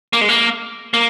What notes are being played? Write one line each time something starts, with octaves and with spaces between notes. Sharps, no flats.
A#3
G#3
A#3
A#3